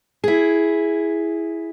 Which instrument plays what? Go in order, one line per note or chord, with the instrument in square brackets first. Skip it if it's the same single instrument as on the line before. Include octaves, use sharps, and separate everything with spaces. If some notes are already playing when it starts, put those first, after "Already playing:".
[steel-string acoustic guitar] E4 G#4